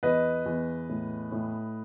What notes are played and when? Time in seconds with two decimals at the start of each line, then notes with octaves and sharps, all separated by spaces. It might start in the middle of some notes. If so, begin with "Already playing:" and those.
0.03 E2 B4 D#5
0.46 E2
0.89 A2
1.32 A2